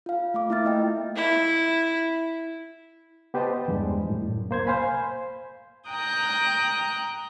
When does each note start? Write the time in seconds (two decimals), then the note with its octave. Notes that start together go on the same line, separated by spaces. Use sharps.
0.06 F4 F5
0.34 A3 F5 D6
0.49 A#3 E4 F4 E5 F6 A6
0.65 A3 D#5 G5
1.16 E4
3.34 B3 G4 B4 C5 D#5 A5
3.68 E2 G2 G3 G#3
4.07 F#2 A2
4.26 F#2
4.49 C2 A#3 C5 G#6
4.67 C5 F5 G#5 B5
5.88 G5 A#5 D#6 F#6 G6